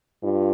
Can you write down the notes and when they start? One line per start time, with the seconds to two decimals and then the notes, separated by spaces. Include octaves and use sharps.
0.23 G2 F4